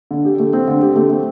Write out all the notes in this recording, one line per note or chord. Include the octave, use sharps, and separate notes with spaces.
D3
G4
A3
C4
D3
G4
A3
C4